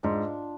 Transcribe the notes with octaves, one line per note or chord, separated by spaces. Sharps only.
G#2 D4 F4